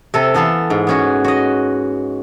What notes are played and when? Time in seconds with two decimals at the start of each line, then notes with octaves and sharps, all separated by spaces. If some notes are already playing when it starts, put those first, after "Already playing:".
0.14 C3 A4
0.34 E3 B3 A4 F5
0.70 G#2
0.87 B3 C#4 F#4
1.24 F#4 D#5